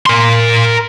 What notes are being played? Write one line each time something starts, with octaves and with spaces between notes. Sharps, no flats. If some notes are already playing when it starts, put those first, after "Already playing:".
A#4 C6